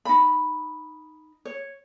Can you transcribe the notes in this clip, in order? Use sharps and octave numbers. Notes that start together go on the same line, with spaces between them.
D#4 B5
C#5